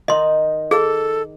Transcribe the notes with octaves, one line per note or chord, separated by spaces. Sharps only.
D#3 D#4 D#5 C6
G#4 A4